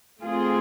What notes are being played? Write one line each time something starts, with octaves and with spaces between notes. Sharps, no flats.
A3 C4 F4 G#4